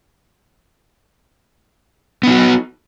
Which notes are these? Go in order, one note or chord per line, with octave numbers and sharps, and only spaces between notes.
B3 D#4 F#4